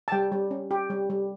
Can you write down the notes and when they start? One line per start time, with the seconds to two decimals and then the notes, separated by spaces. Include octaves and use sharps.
0.08 A5
0.12 G3 G5
0.32 G3
0.51 C#4
0.71 G4
0.90 G3
1.10 G3